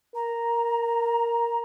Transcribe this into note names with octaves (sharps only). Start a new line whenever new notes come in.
A#4 A#5